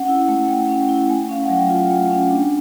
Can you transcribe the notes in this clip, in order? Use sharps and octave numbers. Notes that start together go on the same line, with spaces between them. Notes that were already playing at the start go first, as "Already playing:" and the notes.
Already playing: C#4 F#5
E4
A3
A3 G5
C#4
E4
A3 G#5
C#4 F5
F#5
F#3
G5
F4 G#5
A3
C#4
D4